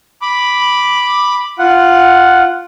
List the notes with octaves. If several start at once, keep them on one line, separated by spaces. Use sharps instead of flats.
B5 D6
F4 F#5